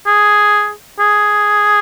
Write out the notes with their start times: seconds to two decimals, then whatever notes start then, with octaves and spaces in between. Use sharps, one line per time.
0.07 G#4
0.99 G#4